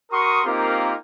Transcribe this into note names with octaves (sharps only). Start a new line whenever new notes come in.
F#4 A#4 C6 C#6 D#6
A#3 C4 D#4 F4 G4 A#4